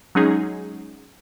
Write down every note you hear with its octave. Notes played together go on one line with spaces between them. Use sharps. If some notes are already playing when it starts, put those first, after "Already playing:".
F#3 G#3 C#4 D#4 G#4